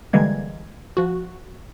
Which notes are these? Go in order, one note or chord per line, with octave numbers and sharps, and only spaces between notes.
D3 E3 G3 G#3 A#3 G#6
F3 F#4